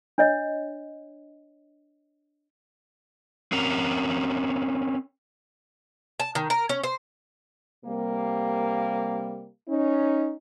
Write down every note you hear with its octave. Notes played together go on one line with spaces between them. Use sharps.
D4 C#5 D#5
C4 C#4 A#4
A5
D#3
A#4
C#4
C5
C3 G3 A#3
C#4 D#4